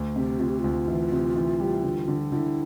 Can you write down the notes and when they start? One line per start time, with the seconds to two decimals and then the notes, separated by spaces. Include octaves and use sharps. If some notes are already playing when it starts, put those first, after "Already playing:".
Already playing: D2
0.16 C3 G4
0.40 C3 F4
0.49 G4
0.59 D2 F4
0.88 E3
1.12 C3
1.36 E3
1.60 G3
1.84 D3
2.08 D3
2.31 D3 E4 F4